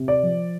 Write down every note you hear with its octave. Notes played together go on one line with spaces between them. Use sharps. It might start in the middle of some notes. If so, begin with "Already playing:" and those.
Already playing: C3
D5
F3